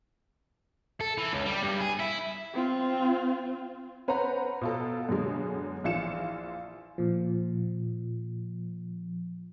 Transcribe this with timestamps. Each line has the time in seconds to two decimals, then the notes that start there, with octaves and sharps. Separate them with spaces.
1.01 A4
1.18 E3
1.33 C#2
1.45 G3
1.62 G2
1.80 G#4
1.99 E4
2.54 C4 F4
4.08 C#4 B4 C5 F#5 A#5
4.61 B2 F4 A4
5.09 F#2 B2 D3 G#3
5.84 A#1 E3 F4 C#7 E7
6.98 A#2 F3